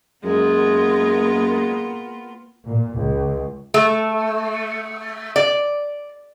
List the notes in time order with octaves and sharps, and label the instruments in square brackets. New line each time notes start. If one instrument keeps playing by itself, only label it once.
[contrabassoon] F#2 [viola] G#3 [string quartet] A#3 B3 F4
[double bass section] A#2
C#2
[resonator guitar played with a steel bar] A3
D5